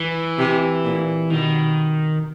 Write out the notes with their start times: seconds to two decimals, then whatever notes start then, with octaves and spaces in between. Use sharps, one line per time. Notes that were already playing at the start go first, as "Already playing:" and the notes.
Already playing: E3
0.38 C3
0.84 A#2
1.30 B2 D#3